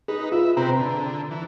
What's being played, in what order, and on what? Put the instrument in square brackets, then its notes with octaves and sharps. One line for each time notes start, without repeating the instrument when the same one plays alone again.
[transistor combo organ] D#4 B4 [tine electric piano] G#4
[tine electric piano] F4 [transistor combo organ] E5
[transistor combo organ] C3 C4 B4 [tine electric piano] A#5
[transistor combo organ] D3
E3